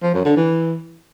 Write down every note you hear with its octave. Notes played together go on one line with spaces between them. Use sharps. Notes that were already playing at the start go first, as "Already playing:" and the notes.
F3
F#2
D3
E3